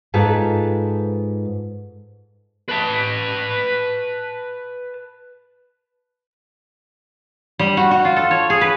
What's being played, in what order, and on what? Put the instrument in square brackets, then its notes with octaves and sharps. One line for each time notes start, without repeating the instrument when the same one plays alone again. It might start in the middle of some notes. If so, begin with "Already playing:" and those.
[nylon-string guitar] G#2 F4 A4 B4
[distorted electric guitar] B4 A5
[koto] G3
F#4
F#4
F4
A4
C#5
G#4
B4